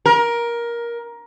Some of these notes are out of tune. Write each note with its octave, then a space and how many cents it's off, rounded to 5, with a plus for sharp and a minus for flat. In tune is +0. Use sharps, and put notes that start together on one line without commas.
A#4 +15